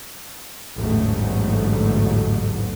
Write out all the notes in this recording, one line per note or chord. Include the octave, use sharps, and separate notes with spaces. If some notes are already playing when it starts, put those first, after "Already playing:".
A1 E2 G#2 D3 F#3 A3